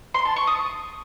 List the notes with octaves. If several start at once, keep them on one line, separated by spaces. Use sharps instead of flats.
C6
A5
C#6
D#6